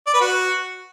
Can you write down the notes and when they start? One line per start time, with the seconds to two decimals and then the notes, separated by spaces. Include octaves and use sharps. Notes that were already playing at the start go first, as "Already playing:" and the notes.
0.07 D5
0.14 B4
0.21 F#4